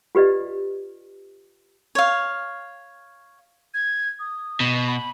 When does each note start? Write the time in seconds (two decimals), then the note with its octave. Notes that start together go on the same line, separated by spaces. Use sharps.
0.15 F4 G4 B4 D5 D#5
1.95 C#5 F5
3.74 G#6
4.19 D#6
4.60 B2
4.87 B5